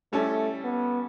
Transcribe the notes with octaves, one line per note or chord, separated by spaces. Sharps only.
G3 A3 C#4 E4 A4
B3